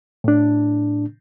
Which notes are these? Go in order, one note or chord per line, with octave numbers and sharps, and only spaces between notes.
A2 D4